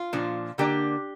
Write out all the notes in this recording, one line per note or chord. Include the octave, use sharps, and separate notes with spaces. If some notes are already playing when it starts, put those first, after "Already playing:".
Already playing: F4
A#2 F3 D4
D3 A#3 D4 G4